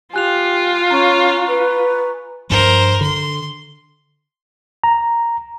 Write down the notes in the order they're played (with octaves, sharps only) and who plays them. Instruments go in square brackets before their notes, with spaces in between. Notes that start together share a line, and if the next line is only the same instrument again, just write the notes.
[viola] F4 [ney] G4 [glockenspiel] G#5 F#6 F7
[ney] C#4 [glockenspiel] A#5 C#6
[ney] B4
[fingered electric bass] G2 F3 [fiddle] A#4 C5
[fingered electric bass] D3 [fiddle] C6
[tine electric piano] A#5